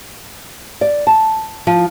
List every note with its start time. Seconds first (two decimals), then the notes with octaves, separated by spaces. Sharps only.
0.81 D5
1.07 A5
1.67 F3